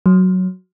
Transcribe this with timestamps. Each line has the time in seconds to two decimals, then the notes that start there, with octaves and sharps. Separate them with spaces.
0.06 F#3